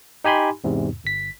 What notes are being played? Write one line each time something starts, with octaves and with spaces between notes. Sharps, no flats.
D#4 G4 G#5 B5 C6
E2 G#2 C3
G1 B6